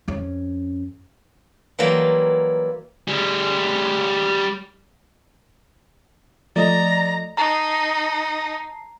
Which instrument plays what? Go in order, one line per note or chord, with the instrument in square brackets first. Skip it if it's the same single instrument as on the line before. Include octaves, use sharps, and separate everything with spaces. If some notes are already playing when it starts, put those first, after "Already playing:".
[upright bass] F2 C#4
[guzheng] E3 F#3 G3 A#3 F4
[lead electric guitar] G3 G#4
[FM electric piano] F3 A3 D#5 [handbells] D5 [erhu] A#5
[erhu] D#4 [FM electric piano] A5 C7 [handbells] A#5